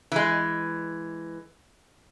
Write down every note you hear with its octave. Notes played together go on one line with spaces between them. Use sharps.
E3 G#3